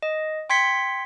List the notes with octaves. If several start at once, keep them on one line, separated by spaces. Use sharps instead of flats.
D#5
G5 C6 G#6 B6 C#7